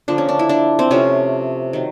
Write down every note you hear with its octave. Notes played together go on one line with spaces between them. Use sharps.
D3 F3 A#3 D4
C#4
D4
E4
D4
C4
C3 F3 A3 C#4
D#3 F#3